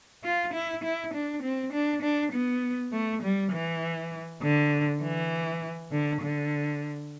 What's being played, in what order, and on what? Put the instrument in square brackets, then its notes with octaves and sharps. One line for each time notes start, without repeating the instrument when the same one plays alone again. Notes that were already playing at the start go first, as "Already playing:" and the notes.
[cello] F4
E4
E4
D4
C4
D4
D4
B3
A3
G3
E3
D3
E3
D3
D3